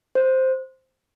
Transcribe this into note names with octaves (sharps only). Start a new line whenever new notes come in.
C5